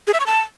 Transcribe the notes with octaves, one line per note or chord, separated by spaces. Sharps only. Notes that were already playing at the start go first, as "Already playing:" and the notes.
G#4
E5
C#6
A5